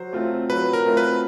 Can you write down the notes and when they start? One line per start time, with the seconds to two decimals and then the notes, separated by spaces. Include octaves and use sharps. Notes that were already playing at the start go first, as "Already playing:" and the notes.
Already playing: F#3 C5
0.13 A3 C4 F4
0.50 F#3 B4
0.73 A#4
0.86 A3 C4 F4
0.97 B4